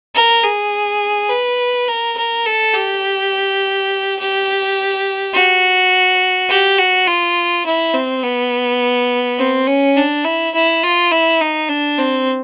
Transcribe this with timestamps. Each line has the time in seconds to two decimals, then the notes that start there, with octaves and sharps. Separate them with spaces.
0.15 A#4
0.44 G#4
1.30 B4
1.88 A#4
2.17 A#4
2.46 A4
2.74 G4
4.19 G4
5.34 F#4
6.49 G4
6.78 F#4
7.08 F4
7.66 E4
7.94 C4
8.23 B3
9.38 C4
9.67 C#4
9.97 D4
10.25 E4
10.54 E4
10.83 F4
11.11 E4
11.41 D#4
11.69 D4
11.98 C4